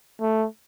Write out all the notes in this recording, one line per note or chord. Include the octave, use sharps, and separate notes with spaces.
A3